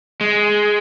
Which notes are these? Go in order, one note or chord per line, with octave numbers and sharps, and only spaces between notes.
G#3